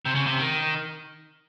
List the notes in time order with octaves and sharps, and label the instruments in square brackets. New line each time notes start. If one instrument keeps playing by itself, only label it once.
[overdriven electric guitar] C3
C#3
C3
D#3